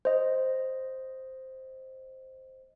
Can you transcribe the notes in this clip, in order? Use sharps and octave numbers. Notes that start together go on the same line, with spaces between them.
C5 D#5